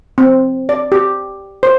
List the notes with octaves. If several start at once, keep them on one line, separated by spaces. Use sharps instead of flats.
C4
D5
G4
C5